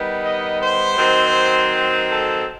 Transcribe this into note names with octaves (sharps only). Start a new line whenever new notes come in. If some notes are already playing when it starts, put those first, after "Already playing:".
Already playing: D#3 G3 B3 D#4
D#5
C5
D#3 F#3 C4
A4